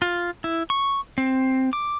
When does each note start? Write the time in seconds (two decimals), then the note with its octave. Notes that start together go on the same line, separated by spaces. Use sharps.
0.02 F4
0.44 E4
0.70 C#6
1.18 C4
1.73 D6